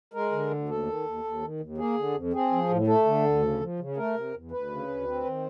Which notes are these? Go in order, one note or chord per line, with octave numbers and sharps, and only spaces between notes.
G#3 A#4
D3
D2
D#2 A4
D#3
D#2
D#2
D#3
D#2
A#3 G#4
D3
F2
C4 G#4
F3
A2
A3 A4
D3
D2
C#3
F3
C#3
A3 A#4
C3
E2
D2 B4
C#3
D2
C4
D#3